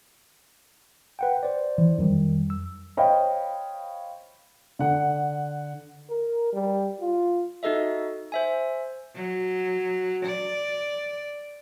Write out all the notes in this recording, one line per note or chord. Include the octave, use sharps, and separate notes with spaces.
B4 F#5 G5
C5 D5
E3
F2 D#3 F#3 G3
E6
C5 C#5 D#5 F5 G5 B5
D3 F#5
A#4
G3
F4
D#4 F#4 A4 D#5 E5
C5 E5 G#5
F#3
D5